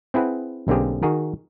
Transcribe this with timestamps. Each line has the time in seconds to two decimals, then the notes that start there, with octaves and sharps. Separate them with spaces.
0.14 C4 E4 G#4 B4 F#5
0.68 B1 D3 A#3 C4 G4 G#4
1.03 D#3 F#4 G#4 A#4